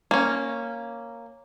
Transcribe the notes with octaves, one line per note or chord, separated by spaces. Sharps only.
A#3 C#4